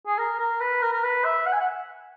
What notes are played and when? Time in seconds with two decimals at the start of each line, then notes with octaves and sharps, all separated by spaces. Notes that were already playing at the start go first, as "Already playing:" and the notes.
0.07 G#4
0.18 A#4
0.39 A#4
0.60 B4
0.82 A#4
0.93 A#4
1.03 B4
1.25 E5
1.46 F#5
1.53 G#5
1.60 F#5